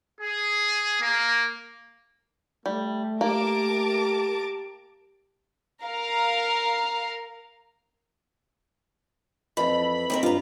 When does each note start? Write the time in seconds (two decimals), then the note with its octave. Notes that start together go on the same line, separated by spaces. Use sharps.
0.20 G#4
1.01 A#3
2.66 G3 A3
3.21 A#3 G4 A#4 A5 D6
5.82 A#4 F5
9.57 F2 E3 B5
10.10 D#2 C4 A#4
10.23 G2 F4 A#5